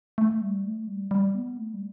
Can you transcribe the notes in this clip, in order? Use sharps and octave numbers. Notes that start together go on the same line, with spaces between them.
A3
G3
A3
G3
G3
B3
A3
G3